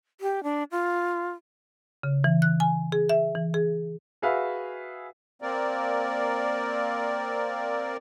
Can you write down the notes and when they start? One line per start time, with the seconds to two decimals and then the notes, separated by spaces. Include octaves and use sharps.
0.21 G4
0.43 D4
0.72 F4
2.03 C#3
2.24 E3
2.42 F#6
2.60 G#5
2.92 G#4
3.09 E5
3.35 E3
3.54 G#4
4.22 F#4 G#4 B4 E5 F5
5.42 A#3 C4 A#4 D5